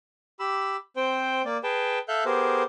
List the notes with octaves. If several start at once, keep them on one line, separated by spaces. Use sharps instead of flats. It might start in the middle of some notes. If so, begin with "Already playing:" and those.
G4 B5 E6
C4 C5 G5
A#3 D5
G#4 B4 G5 A5
A4 E5 F5 F#6 G6
B3 G4 G#4 A#4 C5